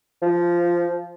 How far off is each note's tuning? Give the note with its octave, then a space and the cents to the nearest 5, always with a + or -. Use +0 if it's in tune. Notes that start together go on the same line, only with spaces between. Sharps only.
F3 -10